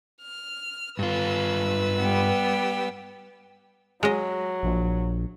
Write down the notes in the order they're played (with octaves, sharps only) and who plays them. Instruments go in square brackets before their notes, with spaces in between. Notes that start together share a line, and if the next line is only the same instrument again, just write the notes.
[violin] F6
[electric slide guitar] G2 F4 [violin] B4 E6
[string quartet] G3 B3 G4
[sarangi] F#3 [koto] G#3 D#5
[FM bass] A#1